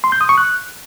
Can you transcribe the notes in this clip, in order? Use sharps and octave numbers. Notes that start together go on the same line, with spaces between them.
C6
G6
D#6
C#6
F#6